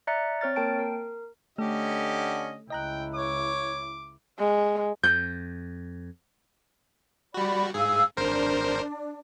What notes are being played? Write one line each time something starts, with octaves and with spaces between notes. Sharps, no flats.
D5 E5 A#5 F#6 A6 C#7
C4 C#5 F6 A6
A#3 A#4 G5 A5 D7
A#4
D3 A3 C#4 G4 A4 D#5
C#2 E4 D#5 G5 A#5 F#6
C#5 D6
G#3
F2 G6
G3 F#4 D5 B5
G#2 G#4 F5 E6
G#1 D4 A#4 C5